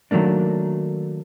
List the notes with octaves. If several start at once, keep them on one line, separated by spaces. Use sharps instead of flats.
D#3 F#3 A3 A#3 D4